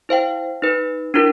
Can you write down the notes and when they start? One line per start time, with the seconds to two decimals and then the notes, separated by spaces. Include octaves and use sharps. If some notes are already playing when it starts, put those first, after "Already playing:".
0.09 E4 C5 F5 G5
0.62 D#4 B4
1.14 D4 E4 F4 A#4